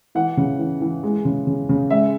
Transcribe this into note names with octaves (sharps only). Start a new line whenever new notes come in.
E3 F#5
C#3
E3
E3
G#3
C#3
C#3
C#3
G#3 E5